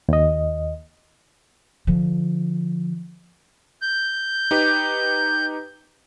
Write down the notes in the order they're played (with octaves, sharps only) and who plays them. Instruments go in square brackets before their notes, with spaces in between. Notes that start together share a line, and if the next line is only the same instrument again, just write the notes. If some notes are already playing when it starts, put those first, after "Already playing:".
[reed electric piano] D#2 D#5
[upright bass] D3 F3
[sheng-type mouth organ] G6
[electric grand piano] D#4 G4 B4